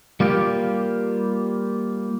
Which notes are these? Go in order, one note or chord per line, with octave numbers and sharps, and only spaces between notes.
G3 A#3 F4 G4